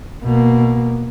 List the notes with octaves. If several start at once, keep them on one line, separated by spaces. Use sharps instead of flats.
B2 A#3